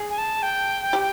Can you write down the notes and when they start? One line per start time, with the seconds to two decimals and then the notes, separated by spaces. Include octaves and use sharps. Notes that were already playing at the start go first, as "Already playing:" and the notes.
Already playing: G#4
0.09 G#5
0.18 A5
0.43 G5
0.93 G4